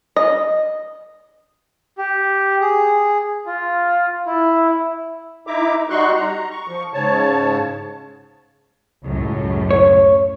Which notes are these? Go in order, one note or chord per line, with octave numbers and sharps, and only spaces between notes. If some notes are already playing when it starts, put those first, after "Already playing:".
D#5
G4
G#4
F4
E4
D#4 E4 E5 A#5 D6
G3 D#4 F#4 C6 C#6 F#6
A#5
C#6
F3 C#6
G#2 C#3 C#5 A5
C#2 F#2 A2
C#5